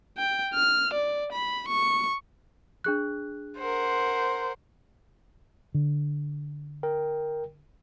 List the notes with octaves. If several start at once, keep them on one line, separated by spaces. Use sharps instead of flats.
G5
F6
D5
B5
C#6
D4 G#4 F#6
A#4 C5 F#5
D3
A#4 G5